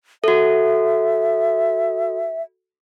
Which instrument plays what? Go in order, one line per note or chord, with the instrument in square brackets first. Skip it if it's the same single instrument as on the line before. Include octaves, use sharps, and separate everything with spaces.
[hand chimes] F#4 A4 [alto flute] E5